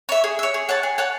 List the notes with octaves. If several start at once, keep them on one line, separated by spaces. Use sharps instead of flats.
C#5 E5
G#4
C#5 E5
G#4
C#5 F#5 A5
G#4
C#5 F#5 A5